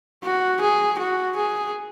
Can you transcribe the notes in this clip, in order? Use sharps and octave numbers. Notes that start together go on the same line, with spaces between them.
F#4
G#4
F#4
G#4